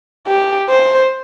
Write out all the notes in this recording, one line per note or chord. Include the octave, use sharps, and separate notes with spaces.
G4
C5